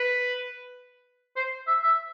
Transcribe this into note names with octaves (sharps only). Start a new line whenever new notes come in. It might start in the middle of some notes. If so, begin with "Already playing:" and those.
Already playing: B4
C5
E5
E5